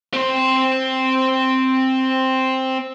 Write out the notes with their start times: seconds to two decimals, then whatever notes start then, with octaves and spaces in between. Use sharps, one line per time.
0.13 C4 C5